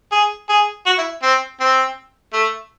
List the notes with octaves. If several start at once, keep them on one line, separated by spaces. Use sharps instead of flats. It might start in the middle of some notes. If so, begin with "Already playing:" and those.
G#4
G#4
F#4
E4
C4
C4
A3